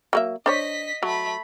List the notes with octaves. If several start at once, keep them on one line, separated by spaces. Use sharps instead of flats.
F#3 A#3 E5
D4 C5 C#5 D#5 B6
F#3 A3 B5